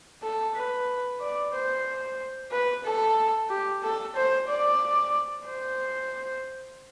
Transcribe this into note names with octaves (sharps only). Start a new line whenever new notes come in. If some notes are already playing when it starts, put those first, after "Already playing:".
A4
B4
D5
C5
B4
A4
G4
A4
C5
D5
C5